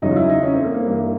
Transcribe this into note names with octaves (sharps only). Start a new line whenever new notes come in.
E2 C#3 F#3 D#4
F4
E4
D#4
C#4
C4
A#3
A#3
G2 E3